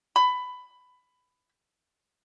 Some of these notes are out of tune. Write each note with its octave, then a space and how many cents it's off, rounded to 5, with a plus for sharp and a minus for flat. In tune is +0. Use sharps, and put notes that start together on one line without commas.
B5 +15